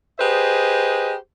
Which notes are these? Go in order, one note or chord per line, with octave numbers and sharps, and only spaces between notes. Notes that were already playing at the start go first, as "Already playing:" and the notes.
G4 G#4 B4 C5 D#5